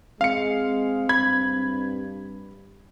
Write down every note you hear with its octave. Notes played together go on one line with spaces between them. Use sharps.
G#3 C4 F5 C#7
G2 B5 G#6